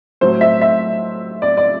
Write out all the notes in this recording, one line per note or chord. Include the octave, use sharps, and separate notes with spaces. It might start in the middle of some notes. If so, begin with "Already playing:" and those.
A2 F#3 C5
E5
E5
D5
D5